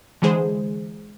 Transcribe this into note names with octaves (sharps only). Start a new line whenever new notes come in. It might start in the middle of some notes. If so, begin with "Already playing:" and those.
D3 E3 G#3 G#4 C5